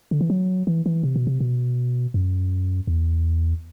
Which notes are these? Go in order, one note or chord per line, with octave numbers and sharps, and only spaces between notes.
D3
E3
F#3
E3
E3
C3
B2
C3
B2
F#2
E2